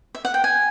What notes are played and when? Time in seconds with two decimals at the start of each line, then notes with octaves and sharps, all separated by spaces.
0.15 E5
0.25 F#5
0.34 G5
0.44 G#5